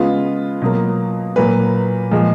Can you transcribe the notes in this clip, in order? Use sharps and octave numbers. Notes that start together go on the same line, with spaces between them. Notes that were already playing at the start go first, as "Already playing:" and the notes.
Already playing: C#3 G#3 B3 F4
B2 F#3 A#3
A#2 F#3 A#3 B4
A#2 F3 G#3